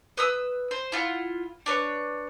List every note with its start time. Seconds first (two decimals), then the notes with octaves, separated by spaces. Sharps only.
0.17 B4 D#6 E6
0.71 C5
0.92 E4 F4 F#5
1.66 D4 B4 C#5